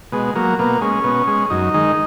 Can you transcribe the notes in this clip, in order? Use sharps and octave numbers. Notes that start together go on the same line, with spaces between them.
B2 G#3
F#3 A#3
B2 A#3
G#3 C#4
B2
G#3
F#2 D#4
D#3 G#3